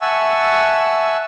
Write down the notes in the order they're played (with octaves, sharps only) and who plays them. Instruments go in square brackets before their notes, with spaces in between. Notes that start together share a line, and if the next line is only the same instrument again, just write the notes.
[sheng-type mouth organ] E5 F#5 G#5 A5 C#6 E6